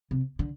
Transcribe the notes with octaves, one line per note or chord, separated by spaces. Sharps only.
C3
D3